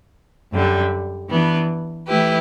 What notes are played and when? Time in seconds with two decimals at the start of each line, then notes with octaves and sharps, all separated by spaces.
0.52 F#2 D3 G3
1.30 E3 B3 D4
2.08 E3 A3 E4 G4 B4